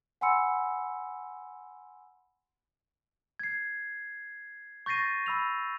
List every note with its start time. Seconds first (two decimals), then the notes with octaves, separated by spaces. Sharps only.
0.21 F#5 G#5 B5 C6 E6 C#7
3.39 G#6 C7
4.86 C#6 G6 A6 A#6 C7 D#7
5.26 B5 E6 F7